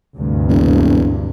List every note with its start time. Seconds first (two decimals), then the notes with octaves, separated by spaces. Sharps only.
0.17 D2 G2 C3
0.49 E1